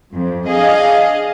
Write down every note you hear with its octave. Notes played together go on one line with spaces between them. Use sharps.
F2
D4 G#4 D#5 F5